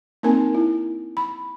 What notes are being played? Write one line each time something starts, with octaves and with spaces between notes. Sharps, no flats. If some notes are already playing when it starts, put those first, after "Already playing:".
A#3 C4 D#4 A#4 G#5 A5
E4
B5